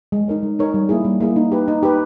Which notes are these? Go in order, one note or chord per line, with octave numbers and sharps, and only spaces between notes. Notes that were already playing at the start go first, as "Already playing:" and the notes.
G#3
D#4 A#4 C#5
G#3
D#4 A#4 C#5
G3
A#3 E4 G#4
G3
A#3 E4 G#4
D#4
G4 B4
D#4
G4 B4